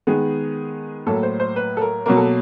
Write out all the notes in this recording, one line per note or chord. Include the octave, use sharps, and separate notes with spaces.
D#3 G#3 B3 G#4
A2 F#3 A#3 A4
C5
C5
B4
A4
A#4
B2 F#3 A#3 A#4
A4